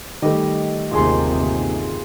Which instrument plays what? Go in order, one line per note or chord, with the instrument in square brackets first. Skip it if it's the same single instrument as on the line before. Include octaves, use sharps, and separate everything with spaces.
[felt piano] D#3 G3 A3 [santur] G4 D#5
[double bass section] G1 D#2 C3 [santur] F4 G#4 C6